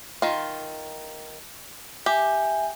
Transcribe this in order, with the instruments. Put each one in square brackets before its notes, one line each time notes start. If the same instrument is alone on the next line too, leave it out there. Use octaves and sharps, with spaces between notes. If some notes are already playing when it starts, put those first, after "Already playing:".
[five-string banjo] D#3 F4
[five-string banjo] G4 [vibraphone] E5 G#5